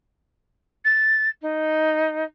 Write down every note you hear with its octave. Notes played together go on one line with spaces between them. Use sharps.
A6
D#4